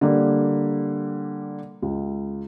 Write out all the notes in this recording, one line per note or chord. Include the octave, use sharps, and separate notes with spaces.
D3 G3 A#3
C#2